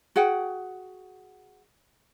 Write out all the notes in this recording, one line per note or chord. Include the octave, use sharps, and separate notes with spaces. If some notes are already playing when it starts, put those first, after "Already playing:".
F#4 G#4 F#5 G5